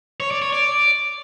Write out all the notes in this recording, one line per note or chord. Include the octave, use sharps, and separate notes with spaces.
C#5
D5
C#5
D5